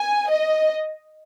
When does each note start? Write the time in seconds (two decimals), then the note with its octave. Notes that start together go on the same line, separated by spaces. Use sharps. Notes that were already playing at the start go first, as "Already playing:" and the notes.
Already playing: G#5
0.29 D#5